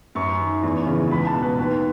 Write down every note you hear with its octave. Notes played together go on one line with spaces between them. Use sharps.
F#2 C#6
D#3
E2
C#3
E3
C#2 B5
A5
B2
B4
D#2